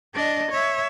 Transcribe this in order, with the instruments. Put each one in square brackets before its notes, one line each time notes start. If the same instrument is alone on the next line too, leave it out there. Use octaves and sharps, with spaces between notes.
[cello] D4 D#5
C#5 E5